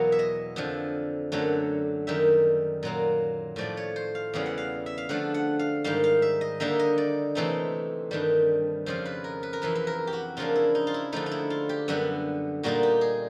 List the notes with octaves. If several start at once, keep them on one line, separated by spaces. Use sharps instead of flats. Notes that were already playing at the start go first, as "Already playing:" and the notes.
Already playing: E2 B2 F#3 A#3 C#5
E5
D#5
F2 D3 F3
F#2 D3 F#3 A3
F#2 D#3 G3 E5
A#2 F#3 A#3
A2 F3 A3 D5
C#5
C5
F5
E2 C#3 E3 G3 F5
F#5
F5
E5
F5
D3 F3 A3 D4 F#5
F#5
F5
G#2 D#3 G3 F5
F5
E5
D#5
D3 G3 A#3 D#4 E5
D#5
D5
C3 E3 A3 C4 D#4
G2 D#3 G3
F2 C#3 F3 C5
B4
A#4
B4
A#4
F2 C3 E3 B4
B4
A#4
G4
F#4
C#3 F3 A#3 D4 F4
E4
D#4
F4
E4
D3 F3 A3 D#4
D#4
E4
F4
G4
F#2 D3 G3 B3 F#4
A#2 G3 A#3 D#4 F#4
G4
G#4